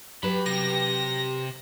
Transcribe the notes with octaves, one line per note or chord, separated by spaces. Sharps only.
F#3 G4 B4 A5 B5
C3 A#6